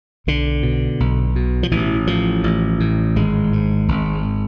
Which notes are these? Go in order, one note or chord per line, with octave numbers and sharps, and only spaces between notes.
B1 D3
B2
B1
B2
F3
A1 E3
A2 F3
A1
A2
G#1 G#3
G#2
G#1